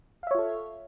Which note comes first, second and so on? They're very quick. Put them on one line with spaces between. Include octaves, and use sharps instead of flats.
F5 E5 C#5 F4 A4